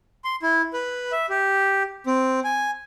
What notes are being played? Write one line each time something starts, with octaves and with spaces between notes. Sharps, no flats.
C6
E4
B4
E5
G4
C4
G#5